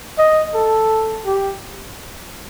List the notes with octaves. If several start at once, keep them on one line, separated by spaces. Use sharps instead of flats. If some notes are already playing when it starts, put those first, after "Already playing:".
D#5
A4
G4